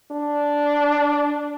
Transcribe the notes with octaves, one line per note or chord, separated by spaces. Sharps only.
D4